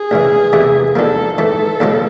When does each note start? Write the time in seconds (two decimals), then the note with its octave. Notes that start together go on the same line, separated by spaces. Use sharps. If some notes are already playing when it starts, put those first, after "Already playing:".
Already playing: G#4
0.11 D2 C#3 E3
0.53 E2 C3 E3 A3
0.95 D#2 D3 F3 A#3 A4
1.38 G#2 E3 A3 A4
1.80 D#2 C#3 F3 G#3 C#4